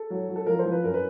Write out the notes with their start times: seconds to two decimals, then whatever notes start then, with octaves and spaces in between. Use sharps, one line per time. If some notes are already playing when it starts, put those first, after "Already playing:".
Already playing: A4
0.10 F#3
0.29 F#3
0.36 A4
0.46 F3 A#4
0.59 C5
0.65 F3
0.72 B4
0.84 F#2 A#4
0.94 B4